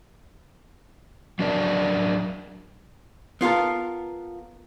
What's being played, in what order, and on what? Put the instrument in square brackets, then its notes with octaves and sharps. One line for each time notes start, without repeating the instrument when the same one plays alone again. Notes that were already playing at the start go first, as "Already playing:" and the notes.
[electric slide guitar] F#3 D4 F#4 A#4 D5
[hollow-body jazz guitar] B3 F4 A4 A#4